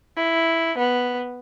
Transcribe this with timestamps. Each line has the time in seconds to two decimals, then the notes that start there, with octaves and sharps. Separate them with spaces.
0.15 E4
0.77 B3